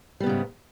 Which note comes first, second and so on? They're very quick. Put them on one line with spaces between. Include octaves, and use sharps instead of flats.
G3 B3 C#3 G#2